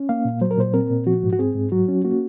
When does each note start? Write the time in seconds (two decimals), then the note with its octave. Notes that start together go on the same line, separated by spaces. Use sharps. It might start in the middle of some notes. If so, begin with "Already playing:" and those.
Already playing: C#4
0.09 A#3 F5
0.25 A#2
0.41 F#3 C5
0.51 A#4
0.58 A#2 C5
0.74 C4 A#4
0.90 A#2
1.07 F3 F#4
1.23 G#2
1.33 F#4
1.39 C4 G#4
1.55 G#2
1.72 F#3 F#4
1.88 C#4
2.05 A#3 F#4